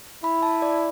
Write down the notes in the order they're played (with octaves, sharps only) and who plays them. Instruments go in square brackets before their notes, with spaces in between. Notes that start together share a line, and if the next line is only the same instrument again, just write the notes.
[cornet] E4 [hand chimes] B5
[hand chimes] A5
D5